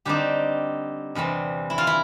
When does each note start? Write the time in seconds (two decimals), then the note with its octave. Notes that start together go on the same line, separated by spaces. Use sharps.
0.05 D3 G3 C4 D#4 G4
1.15 E2 C3 E3 G3 C4
1.70 E4
1.78 F4
1.87 E4